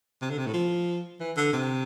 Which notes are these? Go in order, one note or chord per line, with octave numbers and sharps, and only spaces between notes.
C3
D3
C3
A2
F3
E3
D3
C3